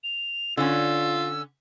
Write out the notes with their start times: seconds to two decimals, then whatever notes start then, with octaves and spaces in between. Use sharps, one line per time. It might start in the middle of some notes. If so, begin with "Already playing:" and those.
0.04 F7
0.57 D3 C#4 F4 E6